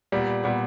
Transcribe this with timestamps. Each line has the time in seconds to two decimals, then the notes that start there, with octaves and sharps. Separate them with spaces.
0.12 A#2 G3 B3
0.44 A#2 G3 B3